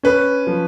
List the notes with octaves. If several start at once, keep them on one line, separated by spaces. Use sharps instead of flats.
C#4 B4
F3